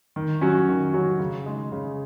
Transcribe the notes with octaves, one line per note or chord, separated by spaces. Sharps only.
D#3
F#3 C#4 F#4
D#3
F#3 C#4 F#4
C#3
G#3 D#4
C#3